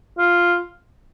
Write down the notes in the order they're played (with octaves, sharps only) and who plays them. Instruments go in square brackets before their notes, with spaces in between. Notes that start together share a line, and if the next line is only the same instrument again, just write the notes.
[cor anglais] F4